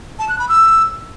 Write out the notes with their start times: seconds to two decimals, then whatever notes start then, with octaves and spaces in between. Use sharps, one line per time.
0.19 A5
0.29 F#6
0.39 B5
0.49 E6